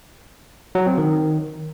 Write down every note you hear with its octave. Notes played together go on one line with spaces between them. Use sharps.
F#3
C4
D#3